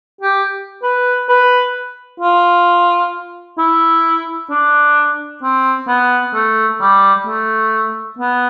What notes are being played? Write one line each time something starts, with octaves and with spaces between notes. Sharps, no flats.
G4
B4
B4
F4
E4
D4
C4
B3
A3
G3
A3
B3